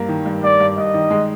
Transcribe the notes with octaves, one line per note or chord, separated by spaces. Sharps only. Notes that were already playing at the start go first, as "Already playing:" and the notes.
Already playing: G2 A#3
D#3
G2
G2 D5
G2
G2 D#5
D#3
G#3